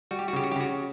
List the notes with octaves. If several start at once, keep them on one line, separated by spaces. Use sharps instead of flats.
G3 F#4
G4
F#4
C#3 G4
F#4
G4
C#3 F#4